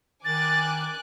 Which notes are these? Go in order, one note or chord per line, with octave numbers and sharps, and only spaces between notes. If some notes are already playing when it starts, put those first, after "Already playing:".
D#3 G#5 D6 F#6 A6